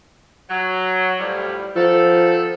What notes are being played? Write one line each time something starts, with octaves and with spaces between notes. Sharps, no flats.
F#3
A2 F3 G3
D#3 F3 B3 A4